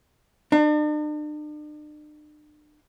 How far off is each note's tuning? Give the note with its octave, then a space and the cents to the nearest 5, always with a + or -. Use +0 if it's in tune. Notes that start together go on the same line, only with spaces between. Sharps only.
D4 +45